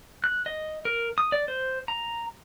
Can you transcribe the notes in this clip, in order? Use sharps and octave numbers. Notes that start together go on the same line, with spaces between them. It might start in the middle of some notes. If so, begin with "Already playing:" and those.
F#6
D#5
A#4
D#6
D5
C5
A#5